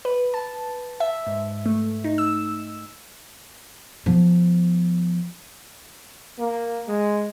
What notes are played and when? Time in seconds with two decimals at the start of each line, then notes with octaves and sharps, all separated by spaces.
0.05 B4
0.34 A5
1.00 E5
1.27 G#2
1.66 A3
2.04 D#4
2.18 E6
4.06 F3 B3
6.39 A#3
6.87 G#3